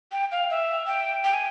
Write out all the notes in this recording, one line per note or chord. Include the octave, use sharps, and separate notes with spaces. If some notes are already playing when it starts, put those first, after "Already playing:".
G5
F5
E5
G5
G5
G#5